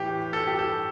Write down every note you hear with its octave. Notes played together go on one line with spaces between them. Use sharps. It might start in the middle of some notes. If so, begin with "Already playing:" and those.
Already playing: A2 E3 G4
A4
G4
A4